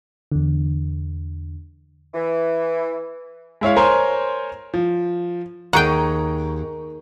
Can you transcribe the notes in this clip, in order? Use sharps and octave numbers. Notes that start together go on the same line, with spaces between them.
E2 D3
E3
G#3 E4 C#5 F5
A#4 C5 C#5 G#5 A#5 C6
F3
D#2 D#3 G#4 F#5 G5 A#5 C#6